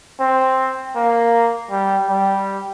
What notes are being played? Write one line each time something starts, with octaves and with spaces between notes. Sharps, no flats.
C4
A#3
G3
G3